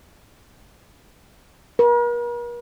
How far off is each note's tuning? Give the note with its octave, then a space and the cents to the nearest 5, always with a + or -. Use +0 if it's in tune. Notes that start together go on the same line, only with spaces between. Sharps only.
A#4 +45